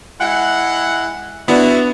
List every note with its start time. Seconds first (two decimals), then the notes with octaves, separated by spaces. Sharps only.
0.20 G#3 E4 F#5
1.48 B3 D4 E4 F#4